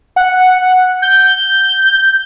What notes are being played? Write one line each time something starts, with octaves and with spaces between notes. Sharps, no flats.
F#5
G6